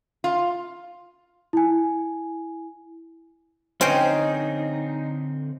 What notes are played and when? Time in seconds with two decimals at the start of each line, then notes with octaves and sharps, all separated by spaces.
0.24 F4
1.53 E4 G#5
3.81 D3 C4 C#4 D#4 C5 G5